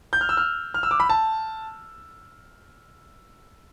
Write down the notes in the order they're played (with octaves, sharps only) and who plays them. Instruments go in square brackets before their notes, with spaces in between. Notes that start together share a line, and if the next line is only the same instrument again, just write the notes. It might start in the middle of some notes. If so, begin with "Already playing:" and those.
[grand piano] G6
F6
E6
F6
F6
E6
D6
B5
A5